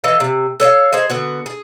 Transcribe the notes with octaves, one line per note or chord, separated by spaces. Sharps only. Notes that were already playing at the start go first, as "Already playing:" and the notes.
E3 A4 D#5 F5
C3
A4 C#5 D#5 F5
D#4 G#4 C5
D3 B3 F#4
G#4